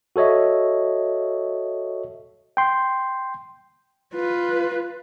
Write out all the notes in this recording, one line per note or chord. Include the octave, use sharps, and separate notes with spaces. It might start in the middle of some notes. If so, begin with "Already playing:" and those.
F#4 A4 C#5 D#5 E5
G5 C6
F4 B4